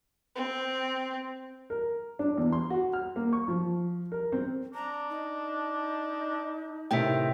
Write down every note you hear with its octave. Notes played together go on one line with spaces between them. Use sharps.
C4
A#4
D4
E2
C6
F#4
F6
A#3
C#6
F3
A#4
C4
D4 A#5
D#4
A2 C3 D#3 E5 G5